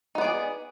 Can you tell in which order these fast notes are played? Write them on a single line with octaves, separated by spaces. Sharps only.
D#4 B3 D5 G#4